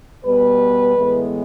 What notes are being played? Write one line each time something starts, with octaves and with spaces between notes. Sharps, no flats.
B2 G3 B3 B4
A2 E3 G#3 B3